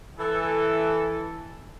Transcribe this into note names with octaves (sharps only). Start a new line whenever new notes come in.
E3 A4